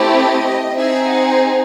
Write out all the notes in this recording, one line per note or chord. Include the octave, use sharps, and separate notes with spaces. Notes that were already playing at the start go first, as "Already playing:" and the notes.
Already playing: A3 C4 E4 G4
D#5
C4 D#4 G#4 E5
F#5